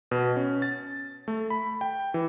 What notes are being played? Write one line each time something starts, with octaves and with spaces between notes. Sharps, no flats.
B2
C#4
A6
A3
B5
G5
E3